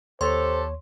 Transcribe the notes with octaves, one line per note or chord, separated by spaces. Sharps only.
D#2 D4 G4 A4 C5 C#5 C6